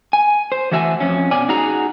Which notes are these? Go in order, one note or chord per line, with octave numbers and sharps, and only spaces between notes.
G#5
C5
E3 A3 F#4 E5 F5 G#5
F2 C#4
B2 C#4 D5 G#5
D#4 F#4 G#4 A#5